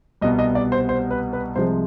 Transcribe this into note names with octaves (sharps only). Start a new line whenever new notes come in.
C2 B2 G3 B3 D#5
D#5
D5
C5
C5
B4
B4
C2 C3 F3 G#3 C5